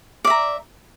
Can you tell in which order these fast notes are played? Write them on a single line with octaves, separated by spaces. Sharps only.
D5 E5 A#5